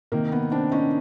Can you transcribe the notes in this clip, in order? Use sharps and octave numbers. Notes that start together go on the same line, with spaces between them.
C3 D#3 A#3
B3
C4 D4
C#4 D#4